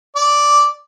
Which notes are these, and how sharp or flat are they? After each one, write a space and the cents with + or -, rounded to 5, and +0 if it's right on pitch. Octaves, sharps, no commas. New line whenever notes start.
D5 -5